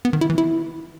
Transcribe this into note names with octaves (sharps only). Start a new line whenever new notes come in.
B3
D#3
E4
E3
E4